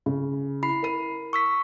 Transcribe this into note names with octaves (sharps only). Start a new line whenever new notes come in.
C#3
E4 B5 C7
A#4 D#7
C#6 E6 B6